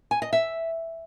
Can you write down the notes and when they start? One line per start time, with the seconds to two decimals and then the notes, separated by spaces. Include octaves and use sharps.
0.11 G#5
0.22 D#5
0.33 E5